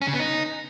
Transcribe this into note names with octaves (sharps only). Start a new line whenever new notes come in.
C#4
C#3
B3
D#4